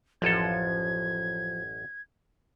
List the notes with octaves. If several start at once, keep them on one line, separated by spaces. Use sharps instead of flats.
A1 F#2 F3 A4 G#6